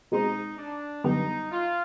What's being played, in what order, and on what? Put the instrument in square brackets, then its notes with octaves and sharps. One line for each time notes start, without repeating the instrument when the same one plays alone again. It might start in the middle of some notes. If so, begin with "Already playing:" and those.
[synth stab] B2 G#3 C4 [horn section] D#4
[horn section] D4
[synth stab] F#2 D3 G3 B3 [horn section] D#4
[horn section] F4